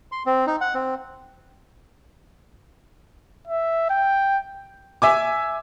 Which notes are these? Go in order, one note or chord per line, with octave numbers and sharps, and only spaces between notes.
C6
C4
D#4
F#5
C4
E5
G5
E5 G#5 D6